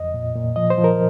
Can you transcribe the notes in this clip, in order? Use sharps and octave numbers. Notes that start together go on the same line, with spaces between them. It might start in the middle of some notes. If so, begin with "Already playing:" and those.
Already playing: F2 D#5
A#2
A#2
F3 D#5
C5
F3
A#4